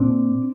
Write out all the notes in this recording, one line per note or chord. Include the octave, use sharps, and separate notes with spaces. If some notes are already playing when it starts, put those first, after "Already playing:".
Already playing: A#2 C4 D4